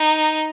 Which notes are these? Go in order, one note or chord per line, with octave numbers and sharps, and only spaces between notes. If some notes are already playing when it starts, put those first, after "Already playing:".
Already playing: D#4